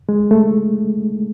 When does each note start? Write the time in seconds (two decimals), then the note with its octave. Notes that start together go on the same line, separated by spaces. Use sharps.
0.09 G#3
0.31 A3